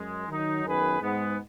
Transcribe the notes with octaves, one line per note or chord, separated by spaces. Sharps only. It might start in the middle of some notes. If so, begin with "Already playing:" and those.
Already playing: F#2 G#3
D#3 F#3 D#4
F#2 D#3 B3 G#4 B4
G#2 G#3 B3